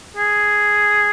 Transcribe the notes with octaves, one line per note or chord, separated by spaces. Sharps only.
G#4